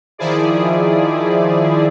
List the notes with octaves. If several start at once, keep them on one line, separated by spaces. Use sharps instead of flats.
D#3 F3 E4 G#4 D5